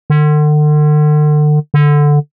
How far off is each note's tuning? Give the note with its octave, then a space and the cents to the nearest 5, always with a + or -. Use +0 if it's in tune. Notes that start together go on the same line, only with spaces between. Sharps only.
D3 +40
D3 +0